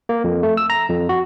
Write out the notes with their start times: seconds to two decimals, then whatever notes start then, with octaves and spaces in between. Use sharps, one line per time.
0.09 A#3
0.24 F2
0.43 A3
0.57 E6
0.70 A#5
0.89 F2
1.09 F#4